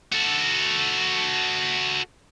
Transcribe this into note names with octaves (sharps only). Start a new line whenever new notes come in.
F#4 A4